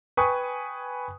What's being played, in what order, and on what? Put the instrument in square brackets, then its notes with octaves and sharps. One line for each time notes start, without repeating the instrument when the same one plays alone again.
[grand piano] B4 G5 G#5 B5 C#6 D#6